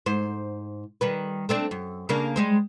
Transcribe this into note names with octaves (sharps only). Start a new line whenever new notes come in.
G#2 C5
D#3 G3 B4
A3 C4 D4
F#2
C#3 A#3 D4
G3 G#3 C5